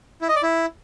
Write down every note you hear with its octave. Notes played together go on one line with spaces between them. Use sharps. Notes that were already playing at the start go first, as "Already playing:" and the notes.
E4
D#5
D5
E4